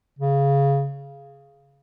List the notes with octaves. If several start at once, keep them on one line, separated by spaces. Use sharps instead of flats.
C#3